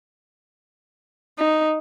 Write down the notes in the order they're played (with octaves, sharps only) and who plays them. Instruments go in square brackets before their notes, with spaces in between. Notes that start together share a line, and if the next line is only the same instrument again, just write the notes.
[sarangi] D#4